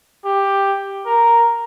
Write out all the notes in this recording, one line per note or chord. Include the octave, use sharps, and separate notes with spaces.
G4
A#4